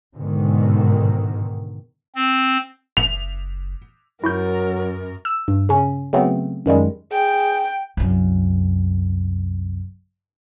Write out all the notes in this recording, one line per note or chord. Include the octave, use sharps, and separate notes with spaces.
G#2 B2 D3 D#3
C4
F#1 F7
F#2 F#3 E4 A#4 C#6 G6
E6
G2
C#3 C#4
C#3 F#3 A3 B3 C4
F#2 D#3 G3 G#3
G#4 G5
C2 F#2